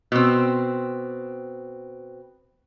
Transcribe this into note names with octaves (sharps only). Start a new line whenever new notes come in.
B2 C4